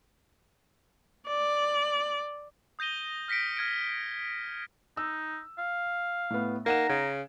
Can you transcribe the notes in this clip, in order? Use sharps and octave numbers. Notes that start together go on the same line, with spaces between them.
D5
D#6 G6 A#6 D#7 G7
F6 A#6 B6 C#7 D7
F6 G#6 D7
D#4 E6
F5
A2 B3
A#3 D#4 F#5 A#5 E7
C#3 G#6